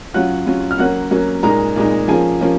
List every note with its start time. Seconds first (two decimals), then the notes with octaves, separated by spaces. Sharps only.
0.14 F#3 C#4 F4 F#5 F#6
0.47 F#3 C#4 F4
0.71 F6
0.78 F#3 A#3 C#4 F#5 F#6
1.11 F#3 A#3 C#4
1.43 A#2 G#3 D#4 A#4 A#5
1.76 A#2 G#3 D#4
2.08 F3 A#3 C#4 F4 G#4 G#5
2.41 F3 A#3 C#4 F4